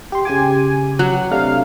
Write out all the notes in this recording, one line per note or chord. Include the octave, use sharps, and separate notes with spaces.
G4 C6
C#3 G4 G#5 D6
F#3 F#5
C3 A3 D4 F5